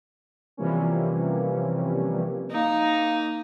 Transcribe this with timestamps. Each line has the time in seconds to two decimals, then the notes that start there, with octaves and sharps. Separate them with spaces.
0.57 C3 E3 F3 G3 A#3 C#4
2.52 A#3 D#4